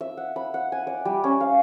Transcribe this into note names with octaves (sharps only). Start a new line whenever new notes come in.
E5
F#5
B5
F#5
G#5
D5
G3
C#4
F5